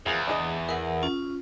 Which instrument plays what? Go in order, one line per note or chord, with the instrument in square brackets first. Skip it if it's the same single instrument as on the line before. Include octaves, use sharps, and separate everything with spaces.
[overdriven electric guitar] E2 [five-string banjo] F3 G#4 A#4
[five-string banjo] D4 G#4 D#5
[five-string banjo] G#4 E5 [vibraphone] A#4 F#5
[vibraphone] C#4 F4